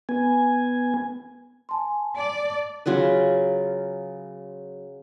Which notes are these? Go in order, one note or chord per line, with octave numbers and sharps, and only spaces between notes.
B3 G#5
G#5 A5 C6
D5 A5
C#3 F#3 F4 B4